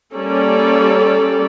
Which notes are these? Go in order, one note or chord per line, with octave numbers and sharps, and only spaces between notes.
G3 A#3 C#4 A4 D5